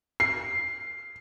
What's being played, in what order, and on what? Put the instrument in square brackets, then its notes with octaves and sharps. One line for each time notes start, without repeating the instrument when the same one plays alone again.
[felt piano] C7